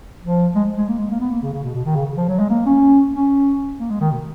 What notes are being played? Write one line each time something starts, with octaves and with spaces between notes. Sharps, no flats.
F3
G#3
G#3
A#3
G#3
A#3
B3
A#3
C#3
C#3
B2
B2
D#3
C#3
F3
F#3
G#3
A#3
C#4
C#4
A#3
G#3
D#3
B2